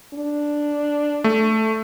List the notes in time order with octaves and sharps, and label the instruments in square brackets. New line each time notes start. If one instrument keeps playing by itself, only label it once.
[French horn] D4
[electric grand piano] A3